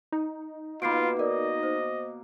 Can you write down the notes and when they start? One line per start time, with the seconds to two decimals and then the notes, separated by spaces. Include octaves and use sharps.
0.12 D#4
0.82 B2 A#3 F4 B5 C7 D7
1.19 A#4 D5 D#5
1.63 C5